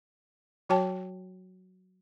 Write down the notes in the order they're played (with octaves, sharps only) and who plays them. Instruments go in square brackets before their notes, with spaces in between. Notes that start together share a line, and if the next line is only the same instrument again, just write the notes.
[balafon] F#3 F#4 C#5 G5 A5